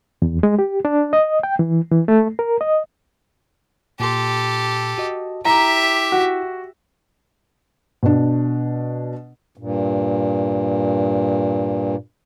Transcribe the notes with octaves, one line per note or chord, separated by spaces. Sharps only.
E2
G#3
G4
D4
D#5
G5
E3
E3
A3
A#4
D#5
A#2 G4 A4 C6
F#4 D#5
E4 G4 E5 A#5
F#4
B2 D4
G2 A#2